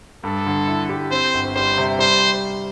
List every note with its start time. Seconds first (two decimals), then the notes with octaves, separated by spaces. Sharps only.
0.24 G2 A4
0.47 D3
0.67 E4
0.89 G4
1.11 C4 C5
1.34 G1
1.55 G3 C5
1.78 C3
1.99 G3 C5